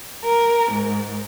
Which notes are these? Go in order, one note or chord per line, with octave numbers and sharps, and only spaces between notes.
A#4
G#2